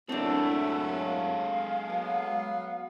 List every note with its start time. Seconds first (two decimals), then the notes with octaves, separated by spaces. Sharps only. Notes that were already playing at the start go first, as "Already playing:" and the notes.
0.09 F#2 A2 F#3 G#3 C4 D4 E4 A4
0.99 F5
1.87 F#3 B3